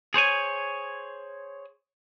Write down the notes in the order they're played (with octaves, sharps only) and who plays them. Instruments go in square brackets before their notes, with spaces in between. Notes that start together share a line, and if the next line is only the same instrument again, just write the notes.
[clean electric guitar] G#4 C5 C#5 G#5